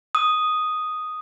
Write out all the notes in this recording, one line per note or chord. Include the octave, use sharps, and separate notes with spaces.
D#6